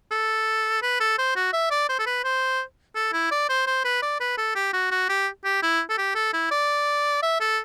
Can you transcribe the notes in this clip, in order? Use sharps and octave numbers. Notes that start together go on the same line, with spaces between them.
A4
B4
A4
C5
F#4
E5
D5
C5
A4
B4
C5
A4
E4
D5
C5
C5
B4
D5
B4
A4
G4
F#4
F#4
G4
G4
E4
A4
G4
A4
E4
D5
E5
A4